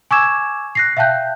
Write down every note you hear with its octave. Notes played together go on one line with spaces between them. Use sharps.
G#5 C#6 D6 E6 G#6 E7
F#6 A#6 C7
E5 F5 G5 A5 F#6 G6